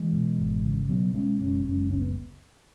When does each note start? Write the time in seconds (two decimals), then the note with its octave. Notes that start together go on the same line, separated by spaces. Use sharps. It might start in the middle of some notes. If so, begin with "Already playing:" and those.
Already playing: E3 G#3
0.13 B2
0.38 G#1
0.63 C#3
0.89 B2 F#3 B3
1.14 B2 G#3 C#4
1.39 F#1 G#3 C#4
1.64 F#1 G#3 C#4
1.90 C#2 C#4
2.00 B3